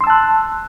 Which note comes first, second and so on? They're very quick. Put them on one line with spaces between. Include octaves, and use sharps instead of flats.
C6 E6 A5 F#6